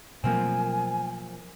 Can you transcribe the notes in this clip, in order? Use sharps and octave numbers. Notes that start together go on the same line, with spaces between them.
B2 F3 F#3 A3 A#3 C4 G#5